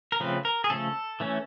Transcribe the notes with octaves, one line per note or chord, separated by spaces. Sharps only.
A#4
C#3 F3 A3 C4 B4
A#4
G#4
C#3 F3 A3 C#4 A4
E3 A3 C#4